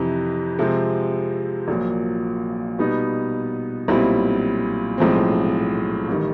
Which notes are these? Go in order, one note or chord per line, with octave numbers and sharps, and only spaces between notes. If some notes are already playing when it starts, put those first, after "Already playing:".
Already playing: F2 C3 E3
C3 F3 G#3 C4
A#1 A#2 F#3 A#3
B2 G3 B3 D#4
B1 A#2 G3 C4 E4
B1 A2 F3 G#3 C4
A1 D#3 G3